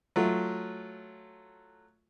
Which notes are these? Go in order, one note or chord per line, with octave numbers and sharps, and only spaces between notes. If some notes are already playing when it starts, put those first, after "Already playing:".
F#3 A3 F4